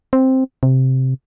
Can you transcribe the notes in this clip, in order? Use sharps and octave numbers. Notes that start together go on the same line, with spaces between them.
C4
C3